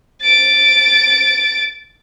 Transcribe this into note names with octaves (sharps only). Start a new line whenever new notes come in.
A6 D7